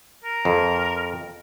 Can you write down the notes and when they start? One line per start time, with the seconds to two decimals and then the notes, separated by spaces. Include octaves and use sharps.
0.24 A#4
0.45 F2